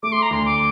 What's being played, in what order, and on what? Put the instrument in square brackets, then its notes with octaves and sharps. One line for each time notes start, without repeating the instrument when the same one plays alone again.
[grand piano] A3 [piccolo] D6
[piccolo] C6
A#5
[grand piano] D2 [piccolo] C6
[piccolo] D6